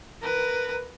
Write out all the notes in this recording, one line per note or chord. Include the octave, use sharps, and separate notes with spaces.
A#4 B4